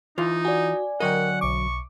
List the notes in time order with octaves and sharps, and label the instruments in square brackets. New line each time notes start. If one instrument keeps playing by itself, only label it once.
[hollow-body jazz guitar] E3 F4 [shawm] D#4
[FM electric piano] F#4 [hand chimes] D5 G#5
[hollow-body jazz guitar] D3 F#3 D#5 [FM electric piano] A#4 G5 [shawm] F#5
[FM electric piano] B1 D6 [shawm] C#6